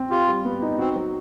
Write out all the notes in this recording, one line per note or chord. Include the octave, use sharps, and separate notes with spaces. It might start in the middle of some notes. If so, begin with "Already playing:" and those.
Already playing: C4
F4 G4
G3
B3
D#4
C4 F#4
F#3